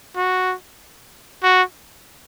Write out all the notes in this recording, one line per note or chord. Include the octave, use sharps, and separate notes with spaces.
F#4
F#4